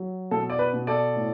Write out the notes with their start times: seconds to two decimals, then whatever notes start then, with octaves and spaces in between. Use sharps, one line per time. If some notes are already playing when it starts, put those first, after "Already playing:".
Already playing: F#3
0.31 B2 A4
0.50 D5
0.59 B4
0.73 B2
0.87 A4 D5
1.16 A2